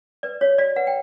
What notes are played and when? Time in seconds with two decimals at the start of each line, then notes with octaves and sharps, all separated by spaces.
0.23 B4 D5
0.41 F#4 C#5
0.58 F#4 D5
0.76 B4 F#5
0.87 G5